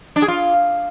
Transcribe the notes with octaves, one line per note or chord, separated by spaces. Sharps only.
D4
G#4
F4